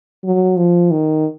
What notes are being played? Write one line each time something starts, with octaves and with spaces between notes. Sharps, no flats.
F#3
F3
D#3